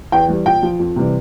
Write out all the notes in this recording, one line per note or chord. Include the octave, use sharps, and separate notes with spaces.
E2 G5
E3 G3
A#2 G5
F3
F2
C3 E3 G3